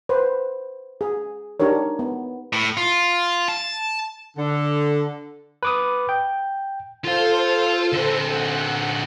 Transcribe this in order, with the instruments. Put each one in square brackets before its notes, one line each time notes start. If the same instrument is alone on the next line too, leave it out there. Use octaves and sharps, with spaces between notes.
[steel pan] B4 C5
G#4
D4 D#4 G4 A#4 C#5
B3
[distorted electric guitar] A2
F4
A5
[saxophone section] D3
[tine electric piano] B4 D6 D#6
G5
[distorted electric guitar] F4 F5 [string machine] A4 C5
[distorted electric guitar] D3 C4
[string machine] F#5